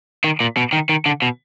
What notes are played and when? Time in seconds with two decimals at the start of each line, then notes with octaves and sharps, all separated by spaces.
0.24 D#3
0.41 A#2
0.57 B2
0.73 D#3
0.89 D#3
1.06 D3
1.22 B2